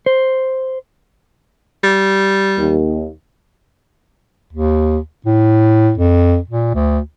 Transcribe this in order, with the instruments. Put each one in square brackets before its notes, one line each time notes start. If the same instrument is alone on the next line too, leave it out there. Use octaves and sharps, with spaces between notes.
[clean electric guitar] C5
[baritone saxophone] G3
[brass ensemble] D#2
[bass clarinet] D#2
A2
F2
A#2
D2